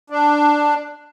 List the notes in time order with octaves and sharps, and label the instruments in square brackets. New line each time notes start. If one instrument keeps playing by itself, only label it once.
[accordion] D4